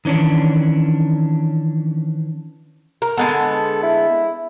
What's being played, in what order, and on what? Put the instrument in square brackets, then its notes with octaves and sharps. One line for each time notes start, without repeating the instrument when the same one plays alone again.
[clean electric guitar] D#3 E3 C#4 D4
[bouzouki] A#4
[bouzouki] D3 G#3 B3 [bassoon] A4
[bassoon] E4